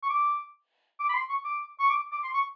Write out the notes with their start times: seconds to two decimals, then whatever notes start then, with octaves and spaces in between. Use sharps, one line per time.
0.03 C#6
0.09 D6
0.99 D6
1.09 B5
1.14 C6
1.29 C#6
1.44 D6
1.79 C#6
1.89 D6
2.12 D6
2.23 C6
2.34 C#6